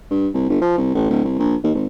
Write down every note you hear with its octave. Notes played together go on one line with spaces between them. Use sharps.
G2
C2
G1
F3
C2
A1
D1
C2
A#1
D#2
G#1